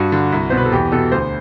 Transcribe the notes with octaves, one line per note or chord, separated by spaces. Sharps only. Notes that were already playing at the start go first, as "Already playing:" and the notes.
Already playing: G2 F#4
D3
C2
B2 C5
B4
A4
E2 G4
B2 A4
D2 C5